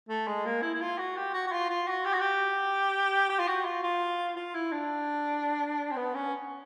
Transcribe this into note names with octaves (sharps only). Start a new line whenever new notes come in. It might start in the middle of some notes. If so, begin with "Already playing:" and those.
A3
G#3
A#3
E4
E4
F4
F#4
G4
F#4
F#4
F4
F4
F#4
G4
F#4
G4
G4
F4
F#4
F4
F4
F4
E4
D4
C4
B3
C#4